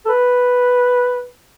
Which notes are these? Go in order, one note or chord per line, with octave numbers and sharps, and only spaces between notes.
A4
B4